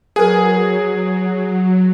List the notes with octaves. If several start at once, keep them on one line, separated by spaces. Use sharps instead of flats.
F#3 G#4 A#4 B4 G#5